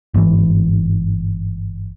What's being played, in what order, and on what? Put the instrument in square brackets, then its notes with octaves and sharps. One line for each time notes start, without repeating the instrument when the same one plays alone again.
[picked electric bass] G1 G#2 C#3 E3